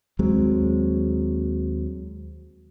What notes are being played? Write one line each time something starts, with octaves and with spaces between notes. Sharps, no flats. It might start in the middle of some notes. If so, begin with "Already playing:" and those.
D#2 F#3 G#3 C4